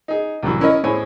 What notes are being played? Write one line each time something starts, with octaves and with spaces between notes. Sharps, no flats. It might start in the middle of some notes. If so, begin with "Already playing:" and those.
D#4 G#4
C2 A2 E3 F#3
C#4 E4 A#4 C#5 D#5
A2 E4 G#4 C5 C#5 G#5